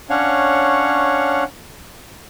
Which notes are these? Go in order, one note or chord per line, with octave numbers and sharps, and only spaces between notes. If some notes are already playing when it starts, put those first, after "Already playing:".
C#4 D4 C#5 F5 F#5 C#6